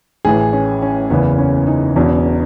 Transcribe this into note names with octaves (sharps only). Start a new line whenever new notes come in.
A1 A2 E3 G#4
C#4
C#4
F#1 E2 C#3 E3 B3
C#4
D#4
E1 E2 B2 C#4